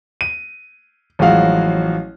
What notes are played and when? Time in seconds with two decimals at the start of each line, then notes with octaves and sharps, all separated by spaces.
0.21 D#7
1.19 A1 F3 F#3 G#3 F#4 F5